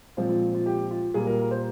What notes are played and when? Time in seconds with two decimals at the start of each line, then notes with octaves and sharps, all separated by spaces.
0.17 A#2 F3 G#3 C4 F4
0.29 F4
0.55 F4
0.66 G4
0.91 F4
1.14 A#2 G3 A#3 G#4
1.27 A#4
1.40 A#4
1.51 C5